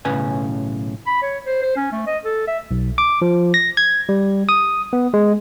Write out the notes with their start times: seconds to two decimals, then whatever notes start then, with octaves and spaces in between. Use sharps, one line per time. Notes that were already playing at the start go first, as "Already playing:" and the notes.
0.05 B1 A2 C#3 C#4 B4 G#5
1.07 B5
1.22 C#5
1.46 C5
1.62 C5
1.77 C#4
1.92 A3
2.06 D#5
2.25 A4
2.47 E5
2.71 B1
2.98 D6
3.22 F3
3.54 A#6
3.77 G#6
4.09 G3
4.49 D#6
4.93 B3
5.14 G#3